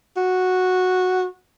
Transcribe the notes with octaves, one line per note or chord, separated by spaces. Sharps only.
F#4